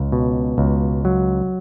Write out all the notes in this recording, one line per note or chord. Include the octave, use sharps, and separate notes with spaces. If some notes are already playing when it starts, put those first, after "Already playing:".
Already playing: C#2
B2
C#2
F#3